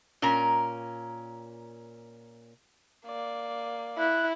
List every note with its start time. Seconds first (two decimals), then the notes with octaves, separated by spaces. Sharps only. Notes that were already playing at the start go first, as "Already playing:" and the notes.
0.22 A#2 C#4 A#4 A#5
3.06 A#3 D5
3.99 E4 F#6